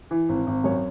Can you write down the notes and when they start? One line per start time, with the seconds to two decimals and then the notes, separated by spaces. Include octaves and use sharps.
0.11 E3
0.29 G#1
0.47 G#1
0.64 F#2 C#5